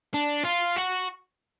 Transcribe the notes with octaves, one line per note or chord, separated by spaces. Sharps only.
D4
F4
F#4